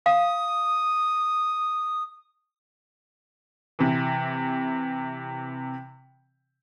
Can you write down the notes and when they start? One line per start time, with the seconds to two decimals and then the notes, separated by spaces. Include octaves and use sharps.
0.06 F5 D#6
3.79 C3 E3